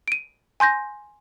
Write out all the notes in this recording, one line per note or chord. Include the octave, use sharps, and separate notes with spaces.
D7 D#7
G#5 C6 G6 A#6